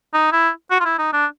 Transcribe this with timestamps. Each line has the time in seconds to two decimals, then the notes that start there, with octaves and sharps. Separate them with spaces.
0.14 D#4
0.32 E4
0.71 F#4
0.80 F4
0.85 E4
0.99 D#4
1.13 D4